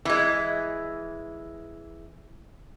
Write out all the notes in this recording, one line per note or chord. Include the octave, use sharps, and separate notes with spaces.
E3 G#3